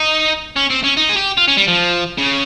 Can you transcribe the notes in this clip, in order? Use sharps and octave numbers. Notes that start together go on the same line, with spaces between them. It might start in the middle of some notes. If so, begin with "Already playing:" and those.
Already playing: D#4
C#4
C4
C#4
D#4
G#4
G4
F4
C#4
G3
F3
C#3